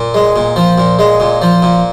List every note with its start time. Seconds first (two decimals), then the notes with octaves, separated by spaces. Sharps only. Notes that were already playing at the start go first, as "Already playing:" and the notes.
Already playing: A#2
0.14 G#3
0.36 A#2
0.56 F3
0.78 A#2
0.99 G#3
1.20 A#2
1.42 F3
1.63 A#2